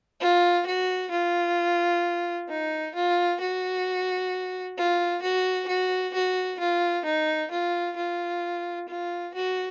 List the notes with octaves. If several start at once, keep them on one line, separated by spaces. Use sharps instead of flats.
F4
F#4
F4
D#4
F4
F#4
F4
F#4
F#4
F#4
F4
D#4
F4
F4
F4
F#4